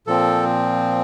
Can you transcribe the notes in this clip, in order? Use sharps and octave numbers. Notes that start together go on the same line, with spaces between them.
A#2 F3 C4 A4